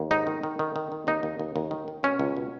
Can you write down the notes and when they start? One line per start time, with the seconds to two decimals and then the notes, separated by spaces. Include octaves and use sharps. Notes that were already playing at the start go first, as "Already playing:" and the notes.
Already playing: D#2
0.11 G#2 D#4
0.27 D#3
0.43 D#3
0.59 D#3
0.76 D#3
0.92 D#3
1.07 D#2 D#4
1.23 D#2
1.39 D#2
1.56 D#2
1.71 D#3
1.88 D#3
2.03 B2 C#4
2.19 C#2
2.37 B2